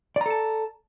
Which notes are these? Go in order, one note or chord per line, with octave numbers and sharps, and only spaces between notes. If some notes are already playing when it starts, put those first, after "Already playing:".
A4 D5 A5 A#5